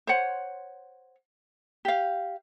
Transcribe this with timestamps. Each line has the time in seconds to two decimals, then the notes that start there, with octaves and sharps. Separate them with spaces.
0.07 C5 C#5 F#5
1.85 G4 F5